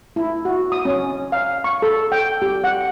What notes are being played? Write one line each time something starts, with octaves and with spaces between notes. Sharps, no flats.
E4
F#4
D#6
C#4
F5
C#6
A4
G5
G4
F#5